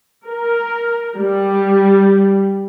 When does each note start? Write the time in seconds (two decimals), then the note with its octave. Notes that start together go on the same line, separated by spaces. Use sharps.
0.25 A#4
1.17 G3